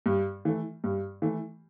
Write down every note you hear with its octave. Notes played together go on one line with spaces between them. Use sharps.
G2
E3 A3
G2
E3 A3